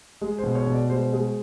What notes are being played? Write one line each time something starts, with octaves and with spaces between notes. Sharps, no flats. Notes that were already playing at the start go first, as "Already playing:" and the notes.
G#3
C5
B2
C#5
B2
D5
G#3 C5
G#3